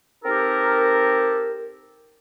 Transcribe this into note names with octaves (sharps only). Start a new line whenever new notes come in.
C4 D#4 G4 A4 A#4